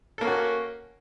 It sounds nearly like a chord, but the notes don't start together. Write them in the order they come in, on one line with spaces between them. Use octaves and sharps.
A4 A#3 C#4 F#4